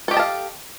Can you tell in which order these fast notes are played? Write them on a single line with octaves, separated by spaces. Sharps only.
A4 G4 D#5 A5 F5